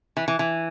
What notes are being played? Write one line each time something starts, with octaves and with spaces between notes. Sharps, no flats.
E3
E3
E3